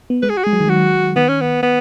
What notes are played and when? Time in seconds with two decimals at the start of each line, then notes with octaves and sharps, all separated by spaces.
0.10 B3
0.22 G#3 B4
0.30 G#4
0.37 F#4
0.44 G#3 G#4
0.53 F#3
0.60 D#3
0.67 F#3 F#4
1.16 D#3 B3
1.29 C#4
1.41 B3
1.63 B3